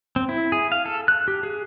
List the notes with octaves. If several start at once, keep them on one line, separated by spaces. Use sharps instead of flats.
C4
E4
G#4
F5
A4
F#6
G4
G#4